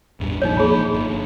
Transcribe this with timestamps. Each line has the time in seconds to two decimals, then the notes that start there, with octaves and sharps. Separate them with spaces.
0.20 A1 E2 G2
0.42 A1 A#2 F3 D#4 C#5
0.57 F3 A#3 G#4 B5
0.93 G1
1.08 G1